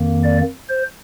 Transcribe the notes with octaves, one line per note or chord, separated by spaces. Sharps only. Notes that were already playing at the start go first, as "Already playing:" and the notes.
Already playing: F2 D#3 A#3
D5
C5